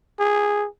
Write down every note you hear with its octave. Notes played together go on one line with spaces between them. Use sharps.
G#4